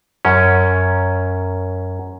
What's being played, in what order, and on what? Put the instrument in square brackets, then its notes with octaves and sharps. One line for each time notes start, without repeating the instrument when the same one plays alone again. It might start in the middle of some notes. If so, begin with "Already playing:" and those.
[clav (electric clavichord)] F#2 C#4